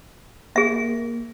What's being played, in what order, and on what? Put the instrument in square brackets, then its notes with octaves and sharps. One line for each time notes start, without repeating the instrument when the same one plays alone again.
[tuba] A#3 [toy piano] G#4 E5